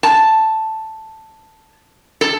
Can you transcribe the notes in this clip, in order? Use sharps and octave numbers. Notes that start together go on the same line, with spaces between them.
A5
A4